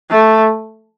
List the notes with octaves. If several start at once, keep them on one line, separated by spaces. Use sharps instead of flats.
A3